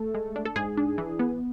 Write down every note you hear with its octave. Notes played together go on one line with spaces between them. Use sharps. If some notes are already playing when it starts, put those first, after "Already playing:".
Already playing: A3 A4
G#3
D4
A4
G#2 G#4
D4
E3
B3